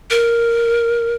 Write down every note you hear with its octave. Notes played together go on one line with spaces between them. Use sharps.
A#4